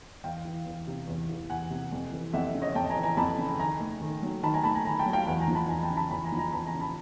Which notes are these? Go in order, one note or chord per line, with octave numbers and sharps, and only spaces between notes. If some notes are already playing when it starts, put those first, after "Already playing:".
E2 F5 G5
E3
E2
C3
E2
E3
E2 F#5 G#5
C3
F2
E3
F2 E5 F#5
C#3
C#5 D#5
F2 G5 A5
G#5 A#5
E3
G#5 A#5
F2 A5 B5
C#3
D#3 G#5 A#5
A3
D#3
F#3
D#3 A5 B5
G#5 A#5
A3 A5 B5
G#5 A#5
D#3 G#5 A#5
G5 A5
F#3
F5 G5
E2 F#5 G#5
G#5 A#5
F3
A5 B5
E2 G#5 A#5
G5 A5
C#3
A5 B5
E2 A5 B5
G#5 A#5
F3
G#5 A#5
E2 A5 B5
G#5 A#5
C#3
A5 B5